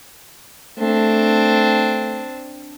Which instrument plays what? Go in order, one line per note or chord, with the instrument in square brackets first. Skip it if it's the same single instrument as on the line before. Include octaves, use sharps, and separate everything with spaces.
[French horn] A3 [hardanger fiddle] C4 D4